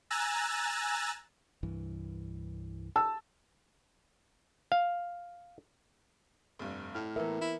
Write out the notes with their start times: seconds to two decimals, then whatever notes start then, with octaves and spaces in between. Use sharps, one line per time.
0.10 G#5 A#5 E6 F#6 A6
1.63 C2 G2 E3
2.96 A5 E6
4.72 F5
6.59 F1 G2
6.95 A2 F6
7.16 E3 B3 A#4 E5
7.41 E4